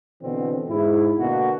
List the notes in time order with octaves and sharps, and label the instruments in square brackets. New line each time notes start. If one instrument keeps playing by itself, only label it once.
[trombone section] B2 D3 E3 C4
G#2 E4
B2 D3 A#3 F#4